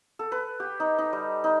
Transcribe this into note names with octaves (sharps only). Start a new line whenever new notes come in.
A4
B4
G4
D#4
D#4
G3
D#4